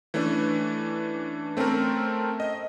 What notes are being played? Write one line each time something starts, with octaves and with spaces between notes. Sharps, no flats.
E3 A3 C#4 D4
A3 C4 C#4 A4 A#4
D#5